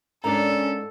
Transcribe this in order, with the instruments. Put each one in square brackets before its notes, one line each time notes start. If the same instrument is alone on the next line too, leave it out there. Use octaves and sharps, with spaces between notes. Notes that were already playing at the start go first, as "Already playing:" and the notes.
[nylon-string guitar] G#2 A#4 D5 [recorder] C#4 [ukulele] D4 A#5 [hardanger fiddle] A4